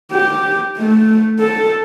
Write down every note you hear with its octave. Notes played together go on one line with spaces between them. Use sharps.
G4
A3
A4